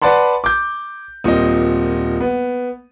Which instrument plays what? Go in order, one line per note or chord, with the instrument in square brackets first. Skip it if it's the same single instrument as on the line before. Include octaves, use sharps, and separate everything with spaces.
[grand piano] B4 D5 F#5 A5 B5 C6
D6 G6
D#1 A#2 C4 D#5
B3